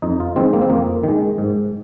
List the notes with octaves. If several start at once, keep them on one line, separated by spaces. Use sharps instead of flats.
F2 D#4
F4
D#3 G#3 C4
A#3
C4
F2 A#3
D#3 G#3
G#2